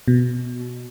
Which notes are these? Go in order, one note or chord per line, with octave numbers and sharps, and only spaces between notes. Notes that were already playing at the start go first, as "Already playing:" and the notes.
B2